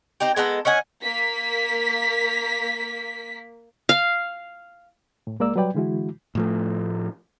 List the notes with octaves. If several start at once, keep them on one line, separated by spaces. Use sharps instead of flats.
C4 D#4 G4
G#3 B3 D#4 A4
C#4 D#5 F#5 G#5
A#3 B6
F5
A2
C2 G#3 A#3 A#4 D5 E6
F#3 G3 B4 D5 G5
D3 E3 G#3 E4 F#4
A2 F3 A3